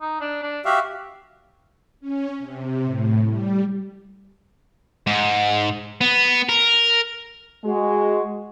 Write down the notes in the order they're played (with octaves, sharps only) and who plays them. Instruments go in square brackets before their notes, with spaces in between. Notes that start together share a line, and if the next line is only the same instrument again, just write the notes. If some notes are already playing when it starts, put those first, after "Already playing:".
[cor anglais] D#4
D4
D4
[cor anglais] F#4 [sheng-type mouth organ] G4 E5 F5
[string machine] C#4
C3
A2
G3
[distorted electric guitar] G#2
B3
A#4
[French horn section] G#3 F#4